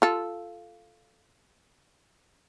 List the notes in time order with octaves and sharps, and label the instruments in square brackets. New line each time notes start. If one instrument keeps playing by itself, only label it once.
[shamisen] F4 A4